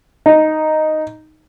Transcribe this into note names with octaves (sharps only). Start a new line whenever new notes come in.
D#4